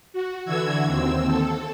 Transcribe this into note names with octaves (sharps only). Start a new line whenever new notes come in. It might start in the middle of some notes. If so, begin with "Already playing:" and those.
F#4
D3 E3 F#4 E6 G#6
D#2 C4 E6
A4